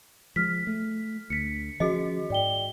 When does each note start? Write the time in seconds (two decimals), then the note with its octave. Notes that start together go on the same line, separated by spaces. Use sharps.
0.36 F3 G#3 F6 B6
0.67 A3
1.30 D2 B6 C#7
1.80 D#3 F3 C#4 F#4 G#4 D#5
2.30 G#2 D5 G5 G7